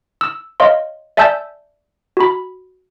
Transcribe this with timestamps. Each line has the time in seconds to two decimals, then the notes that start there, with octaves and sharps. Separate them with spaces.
0.21 E6
0.60 C#5 D#5 F5 C6
1.17 D5 E5 G#5 A5 E6 G6
2.17 F#4 B5